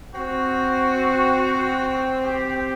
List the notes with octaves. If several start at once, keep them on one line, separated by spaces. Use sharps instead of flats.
C4 F#4
G4